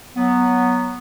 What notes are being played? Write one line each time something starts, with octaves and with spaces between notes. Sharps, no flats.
F#3 B3